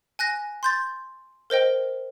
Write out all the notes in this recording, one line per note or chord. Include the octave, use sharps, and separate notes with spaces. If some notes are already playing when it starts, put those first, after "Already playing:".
G#5 F#6 A#6
C6 G6 A6
A#4 C5 D#5 G5